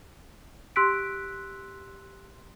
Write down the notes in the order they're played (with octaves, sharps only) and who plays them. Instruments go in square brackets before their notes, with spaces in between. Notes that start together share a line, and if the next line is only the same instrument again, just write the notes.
[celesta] G4 C6 E6 F#6 B6 D7